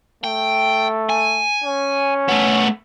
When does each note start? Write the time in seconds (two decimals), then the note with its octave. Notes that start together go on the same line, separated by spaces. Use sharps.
0.24 A3 G5
1.10 G#5
1.64 C#4
2.29 A3 B3